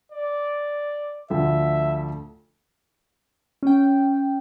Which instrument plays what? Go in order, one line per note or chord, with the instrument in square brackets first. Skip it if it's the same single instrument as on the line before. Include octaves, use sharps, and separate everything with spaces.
[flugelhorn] D5
[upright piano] D2 D3 F3 [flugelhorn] E5
[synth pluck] C#4 G5